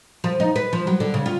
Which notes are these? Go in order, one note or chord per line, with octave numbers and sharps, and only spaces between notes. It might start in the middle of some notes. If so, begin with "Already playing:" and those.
F3
D#4
B4
F3
F#3
D3
C#3
F4